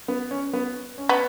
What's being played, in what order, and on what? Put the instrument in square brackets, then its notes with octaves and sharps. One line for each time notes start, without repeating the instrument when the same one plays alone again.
[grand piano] B3
C#4
B3
C#4
[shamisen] B3